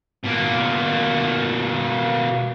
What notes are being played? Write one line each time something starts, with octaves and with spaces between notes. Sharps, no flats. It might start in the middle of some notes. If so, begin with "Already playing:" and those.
B2 A#3